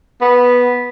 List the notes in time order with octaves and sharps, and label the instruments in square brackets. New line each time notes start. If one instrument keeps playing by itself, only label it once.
[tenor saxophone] B3